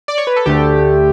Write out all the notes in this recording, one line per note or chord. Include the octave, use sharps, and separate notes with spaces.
D5
C#5
B4
A4
D2 D3 A3 G4